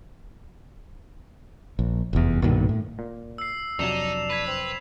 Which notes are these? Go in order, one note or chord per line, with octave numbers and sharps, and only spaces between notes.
A#1
F1 E2
B1 G2 A#2 D#3
A2
A#2
E6 C7
F2 C3 F#3 D4 D#4 C7 E7 F7
B4 G#6 B6 C7
C4 F7